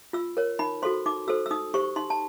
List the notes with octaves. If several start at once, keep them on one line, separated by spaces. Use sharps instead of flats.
F4 E6
A#4 C#5
D#4 B5
F#4 A4 C5 C6
D#4 D6
F#4 A4 C5 E6
E6
D#4 D#6
G4 C5 C#6
D#4 C6
A5